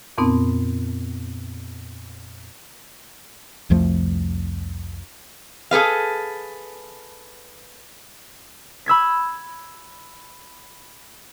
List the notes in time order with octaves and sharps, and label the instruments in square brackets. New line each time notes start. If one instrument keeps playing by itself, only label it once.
[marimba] F2 A#2 B3 C4 D#4
[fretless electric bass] C2 F2 F3 A3
[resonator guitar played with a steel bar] G#4 A4 B4 F5
[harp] B5 E6 G#6 B6